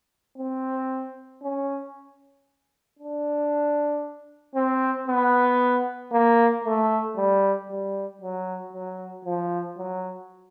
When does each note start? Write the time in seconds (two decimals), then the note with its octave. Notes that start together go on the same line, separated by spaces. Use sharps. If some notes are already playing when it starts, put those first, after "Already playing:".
0.38 C4
1.43 C#4
2.99 D4
4.55 C4
5.08 B3
6.12 A#3
6.64 A3
7.16 G3
7.69 G3
8.22 F#3
8.73 F#3
9.25 F3
9.78 F#3